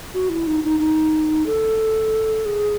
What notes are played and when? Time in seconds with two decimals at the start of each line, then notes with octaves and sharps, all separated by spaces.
0.14 F#4
0.29 E4
0.47 D#4
0.63 D#4
0.79 D#4
1.46 A4
2.46 G#4